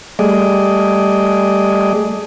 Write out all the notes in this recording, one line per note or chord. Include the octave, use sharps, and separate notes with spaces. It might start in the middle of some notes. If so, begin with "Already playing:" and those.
G3 A3 G#4 D5 D#5